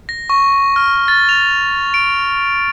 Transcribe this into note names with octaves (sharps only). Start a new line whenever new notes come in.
A#6
C#6
F6
A6
F7
D7